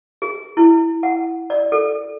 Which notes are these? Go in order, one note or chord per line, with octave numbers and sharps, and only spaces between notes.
G#4
E4
F#5
D5
A4